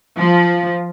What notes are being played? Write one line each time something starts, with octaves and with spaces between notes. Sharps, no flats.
F3